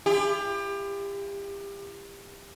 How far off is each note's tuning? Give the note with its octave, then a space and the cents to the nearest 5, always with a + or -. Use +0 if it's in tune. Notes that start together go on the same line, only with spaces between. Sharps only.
E4 +45 G4 +30